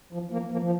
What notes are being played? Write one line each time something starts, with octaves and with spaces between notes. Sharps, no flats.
F3
F3 A#3
F3 A#3
F3